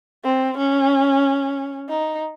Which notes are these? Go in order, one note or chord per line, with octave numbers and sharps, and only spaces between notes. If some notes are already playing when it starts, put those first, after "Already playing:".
C4
C#4
D#4